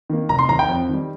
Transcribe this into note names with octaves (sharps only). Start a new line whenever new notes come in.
D#3 A#3
F1 A#5
C6
D#2 D#3 A#5
G5
F2
D#3 G3